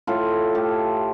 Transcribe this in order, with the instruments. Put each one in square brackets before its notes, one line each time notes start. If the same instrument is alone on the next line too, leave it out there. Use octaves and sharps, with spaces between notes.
[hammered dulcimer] A2 F4 A4
A3 G4